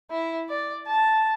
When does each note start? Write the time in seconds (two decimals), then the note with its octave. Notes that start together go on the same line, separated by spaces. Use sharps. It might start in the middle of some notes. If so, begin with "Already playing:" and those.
0.11 E4
0.50 D5
0.87 A5